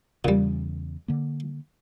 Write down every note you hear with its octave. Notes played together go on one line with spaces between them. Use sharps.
E2 A#2 C#3 G3
D3 A#3